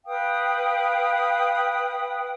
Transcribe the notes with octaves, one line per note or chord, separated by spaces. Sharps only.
B4 F5 G5 D#6